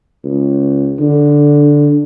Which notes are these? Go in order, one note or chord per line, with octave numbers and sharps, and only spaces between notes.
C#2
D3